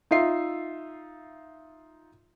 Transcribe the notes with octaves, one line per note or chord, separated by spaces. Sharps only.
D#4 F4 E5 C7